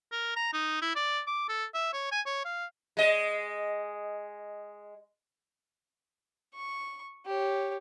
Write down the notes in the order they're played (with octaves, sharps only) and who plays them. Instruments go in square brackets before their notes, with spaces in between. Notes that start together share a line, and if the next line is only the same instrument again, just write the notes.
[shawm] A#4
A#5
D#4
E4
D5
D6
A4
E5
C#5
G#5
C#5
F5
[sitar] G#3 D#5
[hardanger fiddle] C#6
G4 C#5